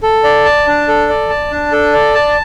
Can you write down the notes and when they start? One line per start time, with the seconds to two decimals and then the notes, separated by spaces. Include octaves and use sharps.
0.03 A4
0.24 D5
0.45 A5
0.67 D4
0.88 A4
1.09 D5
1.30 A5
1.51 D4
1.72 A4
1.94 D5
2.15 A5